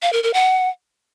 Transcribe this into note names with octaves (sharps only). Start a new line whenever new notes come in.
F5
A#4
A#4
F#5